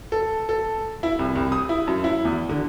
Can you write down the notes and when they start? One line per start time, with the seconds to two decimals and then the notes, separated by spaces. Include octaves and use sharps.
0.12 A4
0.49 A4
1.03 E4
1.19 C2
1.35 C2
1.52 D#6
1.69 E4
1.87 F#2
2.04 E4
2.25 E2
2.49 D3